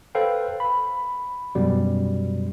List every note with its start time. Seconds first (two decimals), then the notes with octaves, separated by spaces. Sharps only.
0.15 A4 B4 C5 F5 G5
0.60 B5
1.55 F#2 B2 F#3 G3